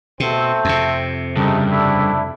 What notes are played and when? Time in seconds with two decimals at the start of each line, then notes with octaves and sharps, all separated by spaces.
0.20 B2 A3 C4
0.65 F2 C3
1.36 G2 C#3 A3 D#4
1.69 A3 D4 E4